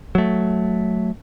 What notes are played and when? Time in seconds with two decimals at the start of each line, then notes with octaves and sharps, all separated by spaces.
0.15 F#3 A3